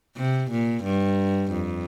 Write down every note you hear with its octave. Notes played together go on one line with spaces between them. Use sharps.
C3
A#2
G2
F2